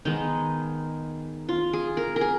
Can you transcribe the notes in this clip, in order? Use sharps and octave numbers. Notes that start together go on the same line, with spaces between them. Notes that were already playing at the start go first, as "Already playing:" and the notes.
D#3 G#3 B3 D#4
F4
G#4
A#4
A#4
G#4